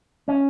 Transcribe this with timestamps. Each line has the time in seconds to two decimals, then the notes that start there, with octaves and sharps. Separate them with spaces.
0.28 C#4